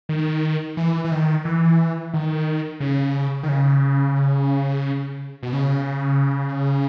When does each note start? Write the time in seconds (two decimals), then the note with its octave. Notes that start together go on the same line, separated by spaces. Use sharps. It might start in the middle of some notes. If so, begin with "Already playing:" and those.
0.09 D#3
0.77 E3
1.05 E3
1.12 D#3
1.45 E3
2.14 D#3
2.80 C#3
3.43 D#3
3.49 C#3
5.43 B2
5.53 C#3